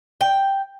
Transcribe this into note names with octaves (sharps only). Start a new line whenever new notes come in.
G5